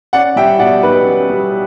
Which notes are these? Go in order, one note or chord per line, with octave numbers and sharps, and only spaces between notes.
C#4 D5 F#5
G3 E5 G5
B2 D5 F#5
B1 B4
C#4
G3